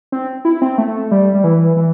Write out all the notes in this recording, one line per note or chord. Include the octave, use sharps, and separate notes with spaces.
C4
E4
C4
A3
G3
G3
E3
E3